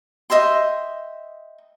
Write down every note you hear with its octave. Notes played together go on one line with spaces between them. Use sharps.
D#5 E5 G5 C6